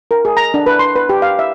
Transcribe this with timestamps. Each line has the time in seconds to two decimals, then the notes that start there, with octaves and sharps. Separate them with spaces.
0.11 A#4
0.25 G#4
0.37 A#5
0.54 D4
0.66 B4
0.79 C6
0.96 B4
1.09 G4
1.22 F5
1.39 E5